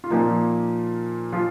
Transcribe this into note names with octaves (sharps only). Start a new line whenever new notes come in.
F4
A#2 F3 A#3 D#4
F3 F4